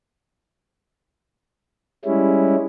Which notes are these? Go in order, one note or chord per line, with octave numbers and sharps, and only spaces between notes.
G3 G#3 C#4 E4